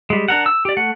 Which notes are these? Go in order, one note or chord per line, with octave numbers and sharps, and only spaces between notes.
G3 G#3
D4 A#4 F#5
E6
G4 D5
A3 F#5